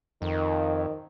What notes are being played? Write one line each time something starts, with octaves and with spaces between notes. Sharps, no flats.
F2 D#3